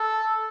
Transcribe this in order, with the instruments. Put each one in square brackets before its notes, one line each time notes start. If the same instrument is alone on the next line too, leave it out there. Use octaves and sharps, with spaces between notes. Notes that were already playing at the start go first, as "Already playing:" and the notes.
Already playing: [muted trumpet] A4